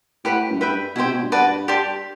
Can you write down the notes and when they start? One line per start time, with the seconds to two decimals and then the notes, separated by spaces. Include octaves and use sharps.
0.24 A2 G4 B4 F#5 B5
0.51 F#2
0.60 G2 B4 E5 G5 B5
0.96 B2 E4 G4 C5
1.05 C3
1.14 B2
1.23 G2
1.32 F#4 B4 D5 A5
1.68 G4 D5 A5 C6